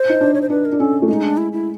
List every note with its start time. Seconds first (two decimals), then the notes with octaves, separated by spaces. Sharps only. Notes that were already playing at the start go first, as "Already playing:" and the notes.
Already playing: C5
0.09 D#4
0.21 D4
0.34 C#5
0.41 C5
0.50 D4 B4
0.65 A#4
0.72 D4
0.80 C#4 A4
1.02 A3
1.08 G#3 D#4
1.23 D4
1.37 E4
1.52 E4